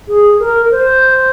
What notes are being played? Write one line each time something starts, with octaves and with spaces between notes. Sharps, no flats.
G#4
A#4
C5